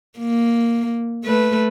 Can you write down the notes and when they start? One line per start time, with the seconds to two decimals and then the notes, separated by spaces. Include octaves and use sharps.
0.18 A#3
1.25 A3 B4